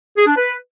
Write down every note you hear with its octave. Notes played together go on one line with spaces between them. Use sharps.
G#4
D4
B4